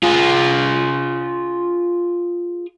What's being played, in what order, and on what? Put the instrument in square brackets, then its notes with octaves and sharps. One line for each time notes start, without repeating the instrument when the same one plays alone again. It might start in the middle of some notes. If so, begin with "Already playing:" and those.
[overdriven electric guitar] F4 G#4